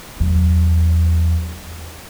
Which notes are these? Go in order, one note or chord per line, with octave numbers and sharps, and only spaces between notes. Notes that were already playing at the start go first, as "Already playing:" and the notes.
E2 F#3